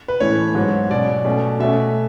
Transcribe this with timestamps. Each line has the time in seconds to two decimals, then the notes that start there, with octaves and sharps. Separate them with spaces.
0.08 B4
0.20 A2 E3 A3 C#4 C#5
0.55 G#2 F#3 B3
0.90 B2 F#3 C#4 D5
1.25 B2 A3 C#4
1.60 B2 A3 C#4 E5